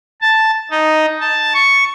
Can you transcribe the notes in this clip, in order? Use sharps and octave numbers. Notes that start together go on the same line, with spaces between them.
A5
D#4
A5
C#6